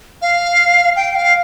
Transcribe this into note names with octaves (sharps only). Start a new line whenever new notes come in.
F5
G5
F5